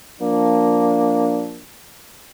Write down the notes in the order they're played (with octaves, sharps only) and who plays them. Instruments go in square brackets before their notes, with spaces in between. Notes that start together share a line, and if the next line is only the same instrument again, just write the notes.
[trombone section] F3 A#3 D4